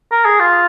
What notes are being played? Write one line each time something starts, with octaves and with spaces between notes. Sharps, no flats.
A#4
G#4
F4